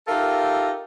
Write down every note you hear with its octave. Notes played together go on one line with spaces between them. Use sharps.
D#4 F4 G4 A4 A#4 E5